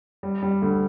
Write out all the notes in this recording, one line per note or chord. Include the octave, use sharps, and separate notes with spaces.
G3
G3
D2